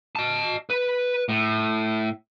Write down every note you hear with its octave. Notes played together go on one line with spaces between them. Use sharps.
D#5 A5
B4
A2